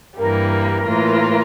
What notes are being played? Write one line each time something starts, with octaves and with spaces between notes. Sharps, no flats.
G2 E3 G3 A#3 A#4
A2 E3 A#3 F4